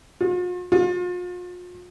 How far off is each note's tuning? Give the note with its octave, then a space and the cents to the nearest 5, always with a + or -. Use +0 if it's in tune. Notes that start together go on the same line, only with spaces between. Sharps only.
F4 +45
F4 +40